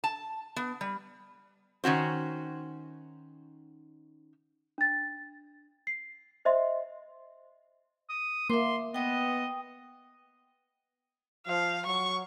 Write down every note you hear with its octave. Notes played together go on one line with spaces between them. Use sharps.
A5
B3
G3
D#3 C#4 F#4 C5
D4 A6
C7
C5 D#5 E5 C6
D#6
A#3 E5 C6 D6
B3 D#5 G5 D#6
F3 F5
F#3 C#6